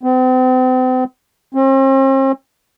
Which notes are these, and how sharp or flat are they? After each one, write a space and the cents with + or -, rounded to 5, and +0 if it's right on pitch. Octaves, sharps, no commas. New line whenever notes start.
C4 -40
C4 +45